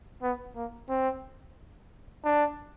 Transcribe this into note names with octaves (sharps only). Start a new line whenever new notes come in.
B3
A#3
C4
D4